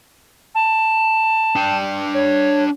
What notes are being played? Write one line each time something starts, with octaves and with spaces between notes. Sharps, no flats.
A5
D4 G5
C#5